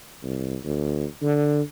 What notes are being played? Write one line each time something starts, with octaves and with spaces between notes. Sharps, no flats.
C2
D2
D3